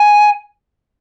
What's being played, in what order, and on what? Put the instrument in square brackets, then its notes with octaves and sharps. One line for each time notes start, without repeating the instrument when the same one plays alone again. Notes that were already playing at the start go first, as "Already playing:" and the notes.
Already playing: [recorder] G#5